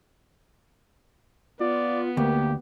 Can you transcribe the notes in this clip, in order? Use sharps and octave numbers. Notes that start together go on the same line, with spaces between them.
B3 F4 D5
D2 A#3 G4